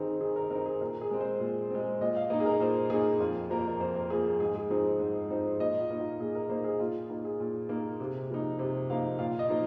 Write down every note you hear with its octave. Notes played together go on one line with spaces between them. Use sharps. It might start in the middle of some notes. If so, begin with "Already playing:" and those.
Already playing: D#3 C4 D#4 G#4 A#4
D#3 G#4
A#4
C4 D#4 A#4
G#4
A#2 A#4
G#4
G#3 C4
C5
A#2
G#3 C4
A#2 D#5
F5
A#3 D#4 D#5
G#4
A#4
A#2 C5
A#3 D#4 G#4
F2 F4
F3 A#3 A#4
C5
A#4
F2 C5
A#4
F3 A#3 G#4
G#4
G#2 G#4
G#4
F3 C4 D#4 G#4
G#2 C5
F3 C4 D#4 C5
A#2 D#5
F4
A#3 D#4
F4
A#2 G#4
A#4
A#3 D#4 C5
G#4
A#2 F4
A#3 D#4 F4
G#4
A#2
A#3 D#4
C3
F3 A#3 D#4
C3 C5
F3 A#3 D#4 F5
A#2 F5
D#5
F3 A#3 D#4